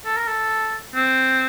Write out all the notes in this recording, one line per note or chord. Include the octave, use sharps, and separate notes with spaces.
A4
A#4
A4
C4